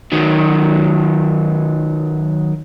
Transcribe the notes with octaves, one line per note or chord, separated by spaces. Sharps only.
D#3 F#3